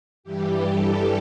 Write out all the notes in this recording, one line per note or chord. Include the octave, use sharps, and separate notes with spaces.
G2 E3 G3 G4
A4